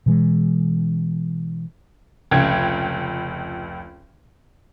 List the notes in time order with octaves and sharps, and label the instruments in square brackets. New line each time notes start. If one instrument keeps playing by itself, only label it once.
[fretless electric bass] B2 E3 G#3
[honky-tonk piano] F1 C#2 G5 G#6